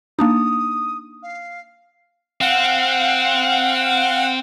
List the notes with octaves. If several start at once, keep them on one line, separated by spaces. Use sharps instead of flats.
A#3 D4 D#4 D#6
F5
C4 F5 F#5